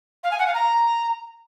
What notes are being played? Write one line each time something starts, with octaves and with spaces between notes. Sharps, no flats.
F5
G#5
F#5
F5
A#5